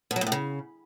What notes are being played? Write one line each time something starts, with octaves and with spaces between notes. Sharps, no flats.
B2
F#3
A#2
A2
C#3